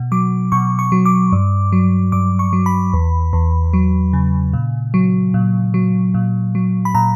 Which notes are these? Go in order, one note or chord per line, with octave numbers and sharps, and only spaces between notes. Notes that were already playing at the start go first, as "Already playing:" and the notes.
Already playing: B2
F#3 D6
B2 C#6
C#6
F#3
D6
G2
F#3
G2 D6
C#6
F#3
B5
E2
E2
F#3
C#3
A#2
F#3
A#2
F#3
A#2
F#3
B5
A#2 A#5